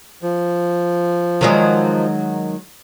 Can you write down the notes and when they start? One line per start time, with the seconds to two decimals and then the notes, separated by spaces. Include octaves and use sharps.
0.22 F3
1.41 D#3 F#3 G#3